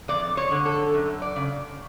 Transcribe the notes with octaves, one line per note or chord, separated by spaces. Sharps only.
F2 D5
C#5
D3
A4
F#2
D5
C#3